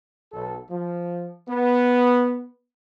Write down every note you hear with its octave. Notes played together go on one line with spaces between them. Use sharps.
B1 A4
F3
B3